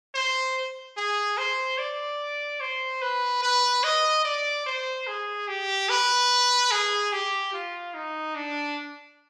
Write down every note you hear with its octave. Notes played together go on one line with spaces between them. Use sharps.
C5
G#4
C5
D5
C5
B4
B4
D#5
D5
C5
G#4
G4
B4
G#4
G4
F4
D#4
D4